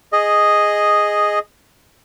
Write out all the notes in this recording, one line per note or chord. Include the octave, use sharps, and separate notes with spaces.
G#4 D#5